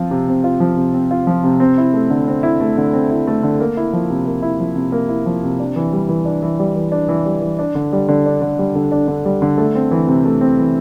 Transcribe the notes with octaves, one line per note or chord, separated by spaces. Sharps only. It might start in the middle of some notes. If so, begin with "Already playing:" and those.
Already playing: F3 C4 F4
C3
C4
F4
F3
C3
C4
F4
F3
C3
C4
E4
A3
D3
C4
E4
A3
D3
C4
E4
A3
D3
A#3
E4
F3
C3
A#3
E4
F3
C3
A#3
E4
F3
C3
D4
E3
G3
E3
D4
E3
G3
E3
D4
E3
G3
E3
D4
D3
G3
D3
D4
D3
G3
D3
D4
D3
G3
D3
A3
C4
E3
C3
A3
C4
E3